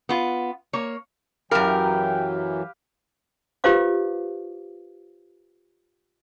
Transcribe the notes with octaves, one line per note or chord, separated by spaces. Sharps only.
B3 F4
A#3 C#5
F#2 E3 F#3 G4 A#4 B4 F5 G5
F4 G4 B4 C5 F5 D6